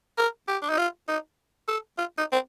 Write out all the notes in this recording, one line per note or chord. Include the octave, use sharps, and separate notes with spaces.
A#4
G4
D4
D#4
F4
D#4
A4
F4
D#4
C4